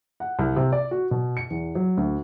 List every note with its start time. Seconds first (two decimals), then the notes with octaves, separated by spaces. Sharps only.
0.20 F#5
0.39 C2
0.56 C3
0.72 D5
0.91 F#4
1.11 B2
1.37 C#7
1.50 E2
1.75 F#3
1.97 D2